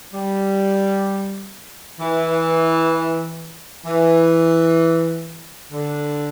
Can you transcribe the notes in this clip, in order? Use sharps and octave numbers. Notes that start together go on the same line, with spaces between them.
G3
E3
E3
D3